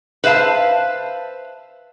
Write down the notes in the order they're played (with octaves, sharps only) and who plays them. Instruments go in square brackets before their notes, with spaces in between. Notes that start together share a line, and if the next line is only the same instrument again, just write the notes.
[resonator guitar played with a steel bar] B4 C5 E5 F5 A5